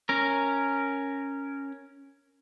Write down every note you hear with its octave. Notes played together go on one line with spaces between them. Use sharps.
C#4 A#4